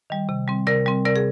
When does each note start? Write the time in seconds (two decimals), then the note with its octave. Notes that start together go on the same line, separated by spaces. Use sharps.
0.10 D#3 G3
0.29 C3
0.48 G3 C4
0.67 C3 A#4 D5
0.86 G3 C4
1.05 C3 A#4 D5
1.16 G#4